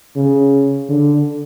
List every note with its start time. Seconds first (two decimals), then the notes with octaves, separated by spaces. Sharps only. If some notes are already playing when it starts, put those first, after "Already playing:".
0.16 C#3
0.89 D3